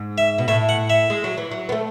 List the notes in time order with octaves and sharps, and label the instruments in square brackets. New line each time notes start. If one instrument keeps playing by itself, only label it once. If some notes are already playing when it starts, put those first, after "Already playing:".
Already playing: [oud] G#2
[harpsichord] E5
[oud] B2
[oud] A2 [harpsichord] E5
[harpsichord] F#5
E5
[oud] G#3
F#3
E3
F#3
B3
A3